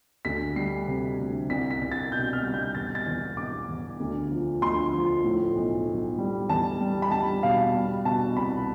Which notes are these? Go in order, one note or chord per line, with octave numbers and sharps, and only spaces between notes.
D2 B6
G3 C7
C3
D2
C2 B6
B6
C2
A6
B2 G6
F6
G3
G6
E1 A6
A6
E2
E1 D6
E1
D2
F3
D2 C6
F3
A2
B1
B1
G3
E2 A5
G3
B5
G3 A5
B2 F5
G3
B2 A5
C2 B5